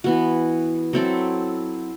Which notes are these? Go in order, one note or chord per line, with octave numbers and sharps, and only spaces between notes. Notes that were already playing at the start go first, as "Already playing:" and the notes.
E3 B3 F#4
F#3 C4 E4 A4